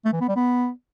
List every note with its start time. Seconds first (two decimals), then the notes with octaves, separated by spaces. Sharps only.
0.05 A3
0.13 E3
0.20 B3
0.28 G3
0.36 B3